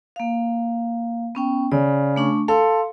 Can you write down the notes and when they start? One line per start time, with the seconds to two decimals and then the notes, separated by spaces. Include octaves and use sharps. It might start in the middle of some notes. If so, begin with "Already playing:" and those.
0.16 A#3 F5
1.35 B3 C#4 G5
1.72 C#3 D5
2.16 A3 D4 C#6
2.48 A4 F5 C6